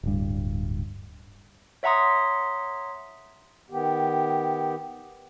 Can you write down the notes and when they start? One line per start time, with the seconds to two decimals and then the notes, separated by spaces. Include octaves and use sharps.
0.03 D1 G2
1.83 C#5 E5 F#5 A#5 C6 D#6
3.70 D#3 B3 G4